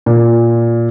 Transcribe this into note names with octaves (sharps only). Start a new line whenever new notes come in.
A#2